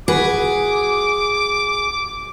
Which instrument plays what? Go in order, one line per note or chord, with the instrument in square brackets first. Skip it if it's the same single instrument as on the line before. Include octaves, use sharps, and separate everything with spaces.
[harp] F#4 B4 [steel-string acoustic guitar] G#4 [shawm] D6